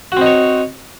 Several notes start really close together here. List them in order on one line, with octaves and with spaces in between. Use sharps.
F#4 C4 D#4 C#5